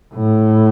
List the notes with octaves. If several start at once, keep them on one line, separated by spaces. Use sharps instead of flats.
A2